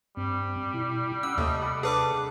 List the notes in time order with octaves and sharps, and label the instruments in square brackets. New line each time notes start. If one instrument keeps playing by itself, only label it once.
[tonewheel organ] G2 C4 [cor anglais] G3
[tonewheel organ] B2 E4
[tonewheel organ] C#4 [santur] F#5 [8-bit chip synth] E6
[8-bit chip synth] D#2 [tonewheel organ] C3 [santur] A3 D#5
[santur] D5 F#5 B5
[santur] D4 A4 [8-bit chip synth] G#4 B4 D6